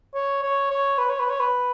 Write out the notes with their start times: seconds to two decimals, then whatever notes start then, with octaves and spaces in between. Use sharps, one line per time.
0.14 C#5
0.43 C#5
0.70 C#5
0.98 B4
1.09 C#5
1.19 B4
1.30 C#5
1.40 B4